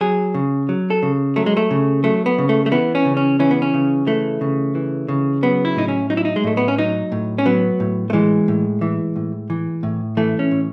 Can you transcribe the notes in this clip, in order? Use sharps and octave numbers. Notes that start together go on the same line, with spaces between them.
F#3 G#4
C#3
F#3
A4
C#3
F#3 A3
G#3
A3
C#3
F#3 A3
B3
C#3
A3
A3
E3 B3
C#4
C#3
C#4
E3 C#4
B3
C#4
C#3
E3 A3
C#3
E3
C#3
F#3 B3
E4
A2 D#4
C#4
F#3 D#4
E4
D#4
G#3
A2 A3
B3
C#4
F#3 D#4
A2
C#4
F#3 B3
A2
A3
E3 G#3
A2
E3
A2
E3
A2
E3 A3
C#4
A2